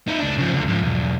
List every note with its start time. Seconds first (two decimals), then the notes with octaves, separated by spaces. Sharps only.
0.08 D#4 E4
0.19 C#2 D4
0.38 C#3 F3
0.53 C#2 D3
0.68 G#2 F3
0.82 B1 E2